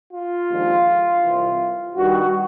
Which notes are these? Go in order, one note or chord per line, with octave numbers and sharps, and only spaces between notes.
F4
D#2 D3 F3 G#3
C2 C3 E3
G2 D#3 G3 F#4